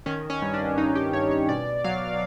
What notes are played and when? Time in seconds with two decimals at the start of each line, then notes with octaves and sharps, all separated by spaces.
0.06 D#3 C#4
0.30 C#4
0.42 G2
0.54 D4
0.78 G2 D#4
0.95 G4
1.13 G2 C#5
1.31 C#5
1.49 B2 D5
1.84 F#3 F5